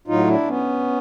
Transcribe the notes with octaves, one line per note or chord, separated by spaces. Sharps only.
A2 F#3 D#4 F4
D4 E4
B3 C#4